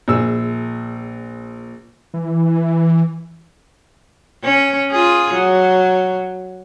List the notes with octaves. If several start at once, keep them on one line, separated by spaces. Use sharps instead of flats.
A#1 G#4 E6
E3
C#4
F4 G#4
F#3